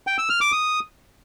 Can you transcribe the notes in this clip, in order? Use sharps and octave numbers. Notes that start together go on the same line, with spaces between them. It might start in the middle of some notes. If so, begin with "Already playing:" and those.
G5
E6
F6
D6
D#6